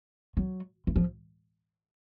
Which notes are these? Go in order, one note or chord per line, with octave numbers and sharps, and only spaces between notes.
F#3
E3
F3